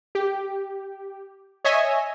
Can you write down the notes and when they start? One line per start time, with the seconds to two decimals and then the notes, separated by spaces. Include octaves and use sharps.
0.15 G4
1.64 C#5 D#5 E5 G#5